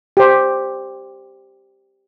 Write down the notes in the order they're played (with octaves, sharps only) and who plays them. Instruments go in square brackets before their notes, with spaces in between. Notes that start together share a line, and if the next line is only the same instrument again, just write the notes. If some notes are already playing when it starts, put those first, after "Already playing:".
[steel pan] G4 C5